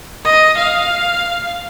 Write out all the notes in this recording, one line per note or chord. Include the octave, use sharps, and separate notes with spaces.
D#5
F5